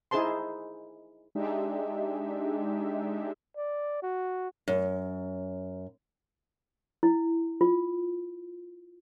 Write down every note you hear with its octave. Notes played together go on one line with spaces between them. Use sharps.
D#4 E4 G#4 C5 A5 C6
G#3 D4 D#4 G4 E5
D5
F#4
F#2
E4
F4